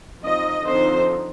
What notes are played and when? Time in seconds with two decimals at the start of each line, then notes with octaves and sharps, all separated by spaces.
0.21 F3 C4 D#4 D#5
0.65 D3 F3 C4 D#4 C5